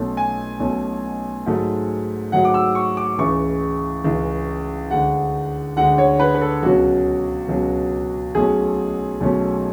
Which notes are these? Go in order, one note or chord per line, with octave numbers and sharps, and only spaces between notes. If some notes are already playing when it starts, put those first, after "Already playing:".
Already playing: B1 B2 A3 C#4
G#5
B1 B2 A3 C#4
G#2 F#3 A3
G#2 F#3 A3 F#5
D6
E6
C#6
D6
C#2 C#3 E3 G#3 C#6
C#2 C#3 E3 G#3
D2 D3 G#3 F#5
D2 D3 G#3 F#5
C#5
B4
B4
A4
C#2 B2 F#3 C#4 F#4
C#2 B2 F#3 C#4
B1 B2 F#3 A3 C#4 G#4
B1 B2 F#3 A3 C#4